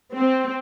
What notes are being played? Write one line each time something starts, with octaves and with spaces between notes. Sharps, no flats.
C4